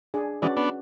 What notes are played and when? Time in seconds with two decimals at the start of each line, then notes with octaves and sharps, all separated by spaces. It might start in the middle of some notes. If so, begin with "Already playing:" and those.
0.14 D4 G#4 D5
0.42 E3 G#3 C#4 F#4 B4 D5
0.57 B3 D4